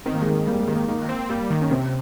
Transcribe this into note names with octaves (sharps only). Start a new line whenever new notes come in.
D#3 C4
A#3
G#3
D#3 A#3
G3 A#3
G#3
D#3
A#3
D#3 A#3
C4
G3 A#3
D#3
C#4
C3 C4